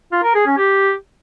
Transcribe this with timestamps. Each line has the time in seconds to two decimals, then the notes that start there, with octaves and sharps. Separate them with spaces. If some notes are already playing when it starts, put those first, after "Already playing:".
0.12 F4
0.23 A#4
0.35 G#4
0.46 C#4
0.58 G4